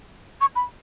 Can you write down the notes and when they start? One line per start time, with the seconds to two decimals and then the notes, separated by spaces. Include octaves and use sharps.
0.41 C#6
0.56 B5